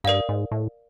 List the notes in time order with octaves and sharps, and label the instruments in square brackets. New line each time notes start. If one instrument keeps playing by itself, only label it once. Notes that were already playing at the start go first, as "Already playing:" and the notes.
[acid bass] G2 [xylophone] A#4 D5 F5
[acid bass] G#2
A2